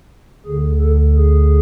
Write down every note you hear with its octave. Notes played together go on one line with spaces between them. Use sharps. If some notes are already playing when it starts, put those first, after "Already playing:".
D2 D3 G#4
A4
G#4